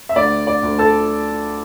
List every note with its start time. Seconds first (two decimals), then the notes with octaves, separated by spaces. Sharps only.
0.09 E5
0.16 D2 D5
0.47 D5
0.63 D2
0.79 A4 A5